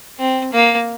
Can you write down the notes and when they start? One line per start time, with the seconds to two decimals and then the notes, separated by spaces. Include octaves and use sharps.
0.19 C4
0.52 A#3